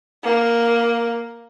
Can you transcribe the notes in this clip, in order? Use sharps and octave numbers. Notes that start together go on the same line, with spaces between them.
A#3